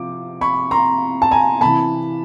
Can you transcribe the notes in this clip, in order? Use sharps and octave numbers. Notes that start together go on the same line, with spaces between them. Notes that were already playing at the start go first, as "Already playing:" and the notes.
Already playing: C3 F3 D6
B5 C#6
A#5 C6
A5
G#5 A#5
C3 E3 A5 B5